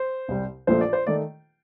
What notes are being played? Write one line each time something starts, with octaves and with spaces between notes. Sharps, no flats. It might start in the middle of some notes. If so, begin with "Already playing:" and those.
Already playing: C5
C2 C3 G3
A#1 A#2 F3 A3 C5
D5
C5
D#3 A3 D5